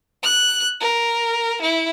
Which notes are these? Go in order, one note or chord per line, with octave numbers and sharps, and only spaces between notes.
F#6
A#4
E4